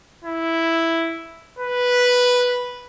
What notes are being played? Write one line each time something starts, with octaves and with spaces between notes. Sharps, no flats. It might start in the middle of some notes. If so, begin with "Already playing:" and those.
E4
B4